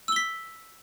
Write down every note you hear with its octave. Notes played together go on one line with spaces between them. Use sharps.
E6 B6 G7